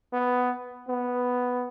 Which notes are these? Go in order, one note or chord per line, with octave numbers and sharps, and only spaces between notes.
B3
B3